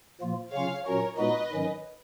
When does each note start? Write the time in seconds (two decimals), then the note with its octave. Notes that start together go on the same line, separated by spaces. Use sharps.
0.21 A#2 F3 A#3 F4
0.53 C#3 F#3 C#4 F4 C#5 F5
0.85 A#2 F#3 C#4 F#4 A#4 C#5
1.18 A#2 G#3 B3 D#4 F#4 B4 D#5
1.51 G#2 D#3 F#3 C#4